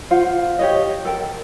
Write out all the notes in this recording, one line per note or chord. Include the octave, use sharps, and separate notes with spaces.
F4 C5 F5 F#5
G4 C#5 D#5
A4 A#4 G5